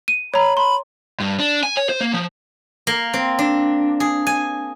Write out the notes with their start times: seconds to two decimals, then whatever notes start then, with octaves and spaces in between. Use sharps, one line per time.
0.08 D#7
0.34 C#5 A#5 B5
0.57 B5 C6
1.20 G2
1.40 D4
1.63 G#5
1.77 C#5
1.89 C5
2.01 A#3
2.13 F3
2.87 A#3
3.14 C4
3.39 D4
4.00 G#4
4.27 G#5